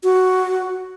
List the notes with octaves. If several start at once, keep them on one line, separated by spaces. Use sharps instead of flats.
F#4